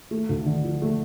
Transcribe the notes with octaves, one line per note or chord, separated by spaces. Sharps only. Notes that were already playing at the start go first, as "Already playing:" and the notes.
A3
D2
D3
F3
A3